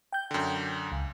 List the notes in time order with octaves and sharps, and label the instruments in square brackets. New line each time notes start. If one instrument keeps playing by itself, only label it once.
[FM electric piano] G5 G6
[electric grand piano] F#2 D3
[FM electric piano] C#2